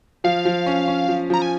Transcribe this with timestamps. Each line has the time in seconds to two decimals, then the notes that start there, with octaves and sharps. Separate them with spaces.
0.24 F3 F5
0.45 F3
0.67 C#4
0.88 C#4
1.09 F3
1.30 F3 A#5
1.42 G#5